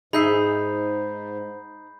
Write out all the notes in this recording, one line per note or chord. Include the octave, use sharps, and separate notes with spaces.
G#2 D#4 G#4 E5 B5 G6 C7